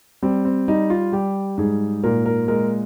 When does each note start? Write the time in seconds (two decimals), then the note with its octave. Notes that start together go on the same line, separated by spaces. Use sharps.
0.22 G3 C4
0.45 C4
0.68 G3 D#4
0.90 F4
1.12 G3 G4
1.58 G#2 G#4
2.04 A#2 A#4
2.26 A#4
2.48 G#3 A#4